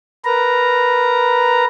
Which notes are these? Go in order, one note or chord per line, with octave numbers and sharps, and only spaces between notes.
A#4 B4 A#5